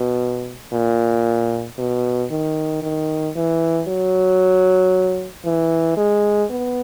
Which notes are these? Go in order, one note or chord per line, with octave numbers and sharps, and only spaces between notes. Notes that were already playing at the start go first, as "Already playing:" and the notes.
Already playing: B2
A#2
B2
D#3
D#3
E3
F#3
E3
G#3
B3